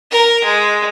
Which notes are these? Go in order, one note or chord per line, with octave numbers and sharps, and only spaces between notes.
A#4
G#3